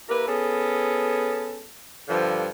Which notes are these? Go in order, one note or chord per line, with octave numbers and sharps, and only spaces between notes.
A#3 E4 G4 A#4 B4
B3 C#4 G#4 A4
G2 D3 F3